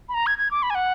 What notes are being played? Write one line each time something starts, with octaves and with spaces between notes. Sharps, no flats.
B5
A#5
G#6
G#6
D6
B5
G#5
F#5